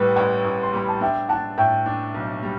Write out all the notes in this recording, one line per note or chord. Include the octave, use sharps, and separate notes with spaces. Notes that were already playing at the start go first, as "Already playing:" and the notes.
Already playing: A1 A2 G3 B4
A1 D5 F#5
A1
C6
G3 B5
A5
D4 E5 G5
D4 F#5 A5
A2 E5 G5
D4
B1
G3